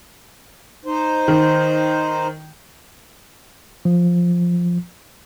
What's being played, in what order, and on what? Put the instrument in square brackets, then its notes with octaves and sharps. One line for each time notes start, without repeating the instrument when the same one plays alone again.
[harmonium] D#4 C5
[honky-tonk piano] D#3
[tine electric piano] F3